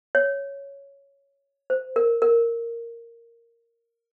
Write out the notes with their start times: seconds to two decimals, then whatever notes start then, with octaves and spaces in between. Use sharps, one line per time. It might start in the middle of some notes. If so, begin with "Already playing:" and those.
0.15 C#5
1.70 C5
1.96 A#4
2.22 A#4